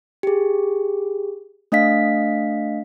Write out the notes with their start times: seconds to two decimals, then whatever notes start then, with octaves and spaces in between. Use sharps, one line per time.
0.23 G4 G#4
1.72 A3 D4 D#5 F5 B6